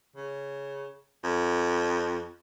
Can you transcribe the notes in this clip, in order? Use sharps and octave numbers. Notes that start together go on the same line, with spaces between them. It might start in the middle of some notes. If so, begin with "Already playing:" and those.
C#3
F2